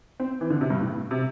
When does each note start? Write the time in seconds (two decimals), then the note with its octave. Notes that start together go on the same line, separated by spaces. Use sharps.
0.20 C4
0.41 E3
0.50 D3
0.61 C3
0.70 G2
0.81 A2
1.11 C3